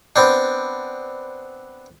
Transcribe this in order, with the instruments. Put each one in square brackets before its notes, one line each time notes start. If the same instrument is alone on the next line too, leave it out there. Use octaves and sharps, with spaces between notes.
[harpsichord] B3 C4 D4